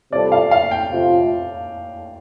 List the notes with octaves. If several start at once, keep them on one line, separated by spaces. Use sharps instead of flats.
C3 G3 F4 A4 D5
F5
F5
G5
C3 A3 F4